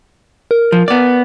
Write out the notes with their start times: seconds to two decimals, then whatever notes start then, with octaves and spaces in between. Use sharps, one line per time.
0.51 A#4
0.72 F3
0.88 B3 D5